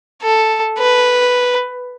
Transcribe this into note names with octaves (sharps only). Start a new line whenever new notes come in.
A4
B4